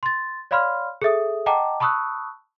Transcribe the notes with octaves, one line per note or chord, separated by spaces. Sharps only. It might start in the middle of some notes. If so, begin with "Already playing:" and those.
C6 A6
C#5 D5 F5 B5 C6 F6
G#4 A4 E5 D#6
D#5 F#5 G5 A5 A#5 D6
A5 B5 C#6 D#6 E6 F#6